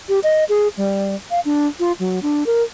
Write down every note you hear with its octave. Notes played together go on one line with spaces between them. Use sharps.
G4
D#5
G#4
G3
F5
D4
F4
F#3
D4
A#4